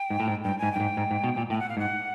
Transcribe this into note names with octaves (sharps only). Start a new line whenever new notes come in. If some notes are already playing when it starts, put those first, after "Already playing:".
Already playing: G5
G#2
A2
G#2
G2 G5
G#2 G#5
G2 G5
G#2
G#2
G#2
B2
A#2
A2 G5
F#5
F5
G#2 F#5